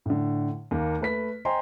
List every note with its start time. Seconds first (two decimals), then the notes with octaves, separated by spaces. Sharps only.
0.06 A2 D3
0.71 D#2 A#3
1.01 A3 B4 B6
1.45 C5 D#5 G5 G#5 A#5 C6